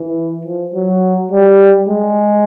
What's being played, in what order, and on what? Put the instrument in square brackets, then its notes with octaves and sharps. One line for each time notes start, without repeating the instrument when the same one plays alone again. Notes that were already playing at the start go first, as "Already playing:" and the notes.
Already playing: [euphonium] E3
F3
F#3
G3
G#3